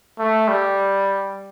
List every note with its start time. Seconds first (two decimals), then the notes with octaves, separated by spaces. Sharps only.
0.19 A3
0.48 G3